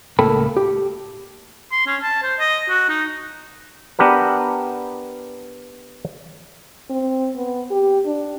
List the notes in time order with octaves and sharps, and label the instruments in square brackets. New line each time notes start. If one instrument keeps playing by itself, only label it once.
[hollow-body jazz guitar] C#2 A2 A#3 A4 G5 B5
G4
[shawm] C6
C#4
A5
C5
D#5
F#4
D#4
[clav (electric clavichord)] B3 D4 G4 A#4 B4
[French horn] C4
B3
G4
D4